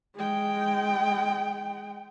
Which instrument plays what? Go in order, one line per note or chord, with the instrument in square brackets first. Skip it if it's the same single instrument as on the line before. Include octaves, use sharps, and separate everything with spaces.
[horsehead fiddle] G#3 G5